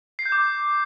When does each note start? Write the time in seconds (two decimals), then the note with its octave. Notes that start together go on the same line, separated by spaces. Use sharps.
0.19 C7
0.26 G6
0.32 D6